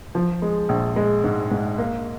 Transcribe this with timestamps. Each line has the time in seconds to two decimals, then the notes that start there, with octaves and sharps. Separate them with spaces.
0.15 F3
0.42 G#3
0.69 A#1
0.96 G#3
1.24 G#2
1.51 G#2
1.78 A#3